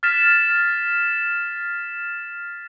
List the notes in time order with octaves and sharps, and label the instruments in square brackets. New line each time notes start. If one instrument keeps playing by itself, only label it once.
[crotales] F6 A6 B6 E7